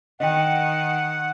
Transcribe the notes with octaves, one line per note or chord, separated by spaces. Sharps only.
D#3 D#5 F#5 G5